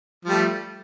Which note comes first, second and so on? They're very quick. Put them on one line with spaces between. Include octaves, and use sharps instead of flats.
F3 G3 A3